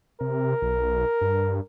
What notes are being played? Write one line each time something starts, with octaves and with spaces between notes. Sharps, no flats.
C3 A#4
B1
G2